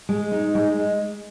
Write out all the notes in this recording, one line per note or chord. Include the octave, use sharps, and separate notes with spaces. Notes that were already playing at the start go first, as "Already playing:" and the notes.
G#3
D#4
G#3